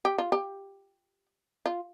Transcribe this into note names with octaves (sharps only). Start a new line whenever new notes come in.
G4
F4
G4
F4